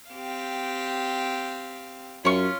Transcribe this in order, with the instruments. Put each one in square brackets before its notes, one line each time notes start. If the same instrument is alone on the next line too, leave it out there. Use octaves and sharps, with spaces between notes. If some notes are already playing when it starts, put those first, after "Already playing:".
[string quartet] C4 G4 F5
[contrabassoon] F#2 [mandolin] C#4 C#6 [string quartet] F4